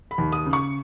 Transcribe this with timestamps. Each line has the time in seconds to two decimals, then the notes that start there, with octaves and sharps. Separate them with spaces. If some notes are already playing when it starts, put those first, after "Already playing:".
0.11 B5
0.18 D#2
0.32 D#6
0.46 C#3
0.53 C#6